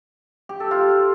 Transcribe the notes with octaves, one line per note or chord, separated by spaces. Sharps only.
G4
A4
F4